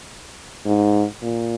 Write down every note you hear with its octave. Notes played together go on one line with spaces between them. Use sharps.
G#2
A#2